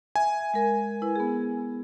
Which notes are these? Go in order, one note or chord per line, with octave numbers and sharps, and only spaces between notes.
E5 G#5
G#3 A#4
E4 B4
B3 G#4